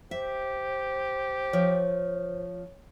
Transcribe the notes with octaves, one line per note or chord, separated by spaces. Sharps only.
G4 C5 E5
F3 C#5